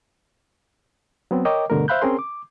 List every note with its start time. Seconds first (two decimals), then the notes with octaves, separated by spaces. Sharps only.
1.31 F#3 B3 C4
1.45 A#4 C#5 D#5 G5 D6
1.70 G2 B2 D3 A3 A#4
1.88 C5 E5 F5 B5 F#6 G6
2.02 C4 C#4 G#4 A#4 C6
2.19 D6